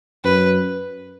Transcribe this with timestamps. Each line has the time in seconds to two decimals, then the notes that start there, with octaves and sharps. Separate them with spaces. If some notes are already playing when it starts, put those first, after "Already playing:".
0.24 F#2 B4